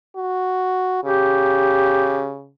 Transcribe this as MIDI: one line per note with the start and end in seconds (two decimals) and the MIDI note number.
0.16 1.02 66
1.04 2.51 49
1.04 2.33 67